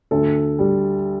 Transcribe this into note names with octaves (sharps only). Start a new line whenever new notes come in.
D2 A4
G3